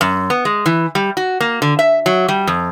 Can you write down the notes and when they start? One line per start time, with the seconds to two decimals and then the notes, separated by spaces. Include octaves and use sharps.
0.01 F#2
0.30 B3
0.45 G#3
0.66 E3
0.95 G3
1.17 F#4
1.40 A#3
1.62 D3
1.79 E5
2.06 F#3
2.28 G3
2.47 F2